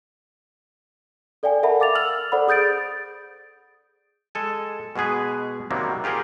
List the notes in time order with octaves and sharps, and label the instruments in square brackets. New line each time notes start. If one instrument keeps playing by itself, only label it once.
[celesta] A4 D5 F5 G5 G#5
A4 A#4 E5 F#5 A5 B5
F5 D6 A6 F7
E6 F6 F7 F#7
A4 C5 D5 F#5 B5
G#4 D#6 G6 A6 D7
[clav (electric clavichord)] G#3 A4 G#5
B2 G#3 B3 G#4 B4
C3 D#3 F#3 G3 A#3
F4 G4 G#4 A#4 F#5